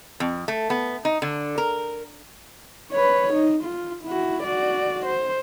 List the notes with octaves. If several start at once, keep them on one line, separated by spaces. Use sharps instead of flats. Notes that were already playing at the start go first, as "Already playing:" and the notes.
F2
A3
B3
D#4
D3
A#4
B4 C#5
D#4
F4
E4 F#4
F#4 D5
C5